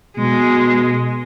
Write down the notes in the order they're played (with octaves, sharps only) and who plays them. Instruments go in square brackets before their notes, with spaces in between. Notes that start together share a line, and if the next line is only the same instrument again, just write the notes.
[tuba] B2 [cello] G#3